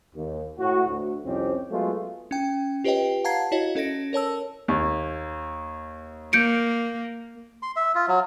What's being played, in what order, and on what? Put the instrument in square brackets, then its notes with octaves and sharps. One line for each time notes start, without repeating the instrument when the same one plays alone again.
[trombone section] D#2
A2 F#4
D2
C2 F2 C4 C#4 G4
F#3 G#3 A3 B3 F4
[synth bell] C#4 G5
F4 G4 B4 C#5 D#5 G5
F5 F#5 A5 A#5 G#6 C7
E4 F#4 C#5 D#5
C#4 A4 D#5 A#6 D7
A#4 C#5 A5 E6
[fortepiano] D#2
[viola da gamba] A#3 [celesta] G6 C#7 D7
[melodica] C6
E5
F4
F#3